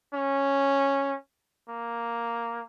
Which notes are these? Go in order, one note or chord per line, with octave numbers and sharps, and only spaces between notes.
C#4
A#3